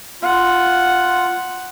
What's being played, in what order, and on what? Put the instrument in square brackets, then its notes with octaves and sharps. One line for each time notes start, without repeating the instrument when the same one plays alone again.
[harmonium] F4 [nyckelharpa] F#5